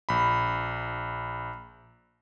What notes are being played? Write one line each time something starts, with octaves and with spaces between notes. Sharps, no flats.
A#1 B5